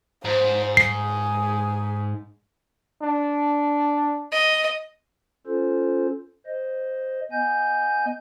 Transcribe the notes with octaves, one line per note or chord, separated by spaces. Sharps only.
G#2 C5
G#4 C7
D4
D#5
C#4 F4 A4 C5
C5 D#5
B3 D#5 G#5 G6